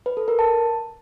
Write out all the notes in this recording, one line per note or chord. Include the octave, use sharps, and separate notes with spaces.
B4
A4
A#4
A5